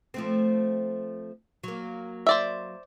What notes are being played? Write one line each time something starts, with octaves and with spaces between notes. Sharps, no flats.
F3 A3 C4
F#3 A#3
C5 D5 E5